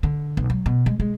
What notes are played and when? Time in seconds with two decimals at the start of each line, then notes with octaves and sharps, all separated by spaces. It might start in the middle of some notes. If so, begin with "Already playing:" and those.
0.03 D3
0.37 B1
0.50 F#3
0.66 B2
0.86 G#3
1.00 G#3